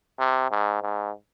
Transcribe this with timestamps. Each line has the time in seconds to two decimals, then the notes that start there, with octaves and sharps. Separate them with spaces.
0.19 C3
0.51 G#2
0.82 G#2